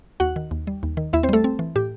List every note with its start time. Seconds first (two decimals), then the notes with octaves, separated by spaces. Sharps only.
0.20 D#2 F#4 F#5
0.36 D#3
0.51 D#2
0.67 G3
0.83 D#2
0.97 D#3
1.13 D#2 E4 E5
1.23 C4 C5
1.29 G3 A3 A4
1.44 C4
1.59 E3
1.76 A2 G4